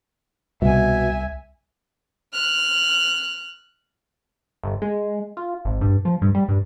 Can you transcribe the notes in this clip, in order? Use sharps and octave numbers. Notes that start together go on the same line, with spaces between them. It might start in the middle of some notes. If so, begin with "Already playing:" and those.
C2 B2 E5 G#5
F6 F#6
G1
G#3
F4
G#1
G2
F3
G2
G3
G2